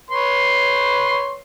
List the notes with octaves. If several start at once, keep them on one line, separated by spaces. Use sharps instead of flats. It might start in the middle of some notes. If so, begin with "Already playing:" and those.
B4 C#5 C6